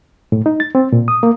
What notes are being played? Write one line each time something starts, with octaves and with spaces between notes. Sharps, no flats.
A2
D#4
A6
C4
A#2
D#6
A#3